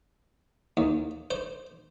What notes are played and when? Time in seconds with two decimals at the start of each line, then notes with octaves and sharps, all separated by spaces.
0.77 D#2
1.31 C5